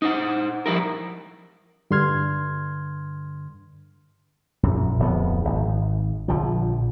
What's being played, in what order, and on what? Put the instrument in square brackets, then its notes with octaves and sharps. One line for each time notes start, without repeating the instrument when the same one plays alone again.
[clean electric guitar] D#4 C5 F#5
F3 G3 E4 A#4
[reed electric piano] G2 D3 C6 F6 G#6
[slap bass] A#1 F#2
D1 F2 B3
G#1
A#1 D3 F3